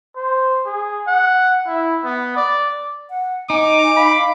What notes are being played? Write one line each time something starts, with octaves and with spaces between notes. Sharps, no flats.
C5
G#4
F#5
E4
B3
D5
F#5
D#4 G#5 D6
F5 B5